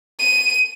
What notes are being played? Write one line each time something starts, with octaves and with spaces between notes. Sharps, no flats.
D#7